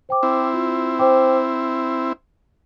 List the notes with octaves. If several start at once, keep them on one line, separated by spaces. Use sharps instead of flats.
C5 G5 D6
C4 E4
F4
C5 G5 D6